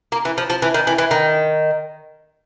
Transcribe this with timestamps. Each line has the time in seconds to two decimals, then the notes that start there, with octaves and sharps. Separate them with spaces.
0.12 A#3
0.25 E3
0.38 F3
0.50 F3
0.62 E3
0.74 D#3
0.87 E3
0.98 E3
1.11 D#3